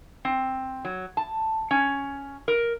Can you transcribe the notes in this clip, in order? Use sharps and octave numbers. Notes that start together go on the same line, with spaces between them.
C4
F#3
A5
C#4
A#4